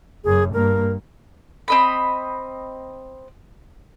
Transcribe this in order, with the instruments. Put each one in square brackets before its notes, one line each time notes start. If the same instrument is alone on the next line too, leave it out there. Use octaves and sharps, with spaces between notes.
[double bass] F#1 F#2 [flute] G#4
[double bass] G2 A#3 [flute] A#4
[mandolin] C4 D#5 B5